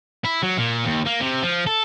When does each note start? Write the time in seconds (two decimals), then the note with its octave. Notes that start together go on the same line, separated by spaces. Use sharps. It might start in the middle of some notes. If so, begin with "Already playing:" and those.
0.25 E4
0.43 F#3
0.58 A#2
0.85 D#2
1.06 A#3
1.20 C3
1.43 F3
1.67 A4